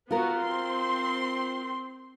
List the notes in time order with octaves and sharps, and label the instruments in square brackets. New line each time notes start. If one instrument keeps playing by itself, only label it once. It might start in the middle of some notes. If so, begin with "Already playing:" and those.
[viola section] B3 F#4 [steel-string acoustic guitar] F4 A#4
[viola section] C4 C6